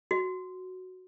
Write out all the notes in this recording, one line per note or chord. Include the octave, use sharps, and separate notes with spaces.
F#4